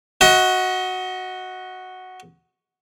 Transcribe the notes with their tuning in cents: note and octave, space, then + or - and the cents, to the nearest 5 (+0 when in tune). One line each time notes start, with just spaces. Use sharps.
F#4 +0 D#5 +30